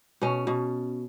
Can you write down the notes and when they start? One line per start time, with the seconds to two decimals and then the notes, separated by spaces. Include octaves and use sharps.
0.21 B2 C#4
0.47 B2